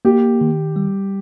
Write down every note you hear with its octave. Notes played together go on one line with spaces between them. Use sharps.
A#3 G4
D#3
G3